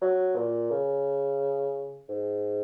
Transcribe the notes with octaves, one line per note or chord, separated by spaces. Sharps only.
F#3
A#2
C#3
G#2